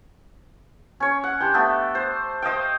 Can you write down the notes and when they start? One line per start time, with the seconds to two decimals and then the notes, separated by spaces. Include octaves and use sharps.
1.00 C#4 C#5
1.24 F#5
1.40 D4 G4 G5 C6
1.54 A3 B3 A4
1.95 C5
2.42 C5 D#5 F5 G5